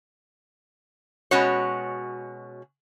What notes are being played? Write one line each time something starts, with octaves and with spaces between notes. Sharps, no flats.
B2 G#3 C#4 F#4 C#5